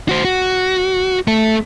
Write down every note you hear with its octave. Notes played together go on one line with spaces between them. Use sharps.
F#4 C5
F#4
A3 A4